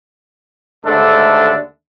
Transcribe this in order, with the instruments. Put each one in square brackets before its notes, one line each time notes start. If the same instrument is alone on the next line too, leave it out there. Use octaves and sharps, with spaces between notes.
[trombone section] D#2 G#2 D3 A3 D4 A4